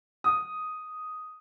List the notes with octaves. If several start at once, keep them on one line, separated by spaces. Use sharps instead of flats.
D#6